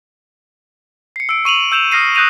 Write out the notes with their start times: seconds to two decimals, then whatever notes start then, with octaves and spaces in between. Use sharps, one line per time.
1.16 C7 C#7
1.29 E6 D7
1.45 C#6 D#7 F7 F#7
1.72 E6 G6 E7 F7
1.92 D#6 F6 A#6 C7 D#7
2.15 D#6 F#6 G6 A#6 D#7 F7